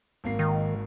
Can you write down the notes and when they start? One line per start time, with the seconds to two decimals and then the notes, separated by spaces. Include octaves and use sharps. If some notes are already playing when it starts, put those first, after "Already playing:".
0.24 G#1 A#3 C7
0.39 D#3